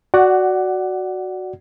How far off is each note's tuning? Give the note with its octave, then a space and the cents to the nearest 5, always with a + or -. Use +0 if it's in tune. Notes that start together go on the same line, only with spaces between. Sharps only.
F#4 +0 D5 +0 F#5 +20